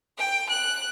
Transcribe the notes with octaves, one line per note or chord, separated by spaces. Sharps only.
G5
F#6